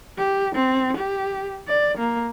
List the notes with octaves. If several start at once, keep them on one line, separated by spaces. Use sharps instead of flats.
G4
C4
G4
D5
A#3